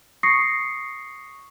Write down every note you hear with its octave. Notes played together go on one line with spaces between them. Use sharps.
C#6 D#6 A#6 C7 C#7